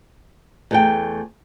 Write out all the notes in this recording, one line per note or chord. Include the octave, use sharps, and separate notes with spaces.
E2 A3 G5